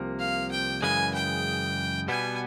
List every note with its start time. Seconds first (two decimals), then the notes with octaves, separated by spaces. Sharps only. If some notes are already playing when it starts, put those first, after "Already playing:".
Already playing: C2 C3 F3 A#3
0.19 F5
0.51 G5
0.82 F#2 C#3 E3 G#3 G#5
1.14 G5
2.08 B2 G3 B3 G#5